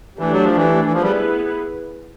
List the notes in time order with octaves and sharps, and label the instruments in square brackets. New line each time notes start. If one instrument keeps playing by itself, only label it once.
[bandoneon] E3 [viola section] A3 D4 G4
[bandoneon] F#3
F3
E3
E3
[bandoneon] F3 [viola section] B3 E4 G#4 B4
[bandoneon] G3